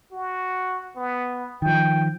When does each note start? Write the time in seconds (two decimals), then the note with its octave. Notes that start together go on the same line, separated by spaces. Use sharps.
0.12 F#4
0.96 B3
1.62 D#3 F3 G5